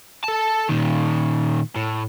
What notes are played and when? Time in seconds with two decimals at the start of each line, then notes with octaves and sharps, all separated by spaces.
0.24 A4 A5
0.69 A#2 D#3
1.76 A2